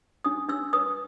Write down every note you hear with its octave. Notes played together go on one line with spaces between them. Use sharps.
D4 D#6
D4 E6
B4 D#6